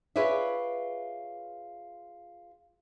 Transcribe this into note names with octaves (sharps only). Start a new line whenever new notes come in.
F4 G#4 B4 C#5 D5 E5